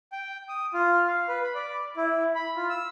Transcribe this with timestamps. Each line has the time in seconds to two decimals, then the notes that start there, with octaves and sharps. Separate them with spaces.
0.12 G5
0.49 D#6
0.74 F4
1.07 F5
1.28 B4
1.43 B5
1.54 D5
1.97 E4
2.35 B5
2.57 F4
2.70 E6